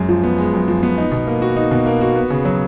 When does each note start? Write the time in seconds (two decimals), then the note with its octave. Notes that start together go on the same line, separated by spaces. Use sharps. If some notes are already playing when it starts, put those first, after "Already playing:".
Already playing: F#2 G#3
0.09 F3
0.24 B3
0.38 G#3
0.53 F#2
0.68 F3
0.83 B3
0.98 D#4
1.12 B2
1.27 A#3
1.42 F#4
1.57 D#4
1.71 B2
1.86 A#3
2.01 F#4
2.16 B3
2.30 C#3
2.45 F#3